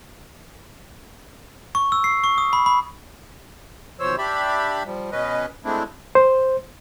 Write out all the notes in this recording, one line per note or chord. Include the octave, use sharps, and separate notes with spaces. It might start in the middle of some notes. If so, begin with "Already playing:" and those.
C#6
E6
C7
C#6
D#6
B5
B5
D#2 B2 F3 C5 C#5 E6
D4 G4 D5 E5 B5
F3 G3
B2 C#4 B4 D#5
G#3 A3 C4 D4 E4
C5